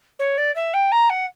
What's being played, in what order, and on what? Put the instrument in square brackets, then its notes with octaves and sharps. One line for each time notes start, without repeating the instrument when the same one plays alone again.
[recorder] C#5
D5
E5
G5
A#5
F#5